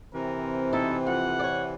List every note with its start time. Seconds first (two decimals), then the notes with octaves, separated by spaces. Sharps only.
0.14 C3 E3 C4 A#4
0.73 B2 D#4 E4 A4
1.07 F2 F#5
1.39 C#5 D5